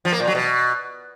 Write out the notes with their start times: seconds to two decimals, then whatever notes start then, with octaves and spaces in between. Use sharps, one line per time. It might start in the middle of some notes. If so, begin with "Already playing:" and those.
0.05 F3
0.12 A#3
0.20 A#2
0.27 F#3
0.35 B2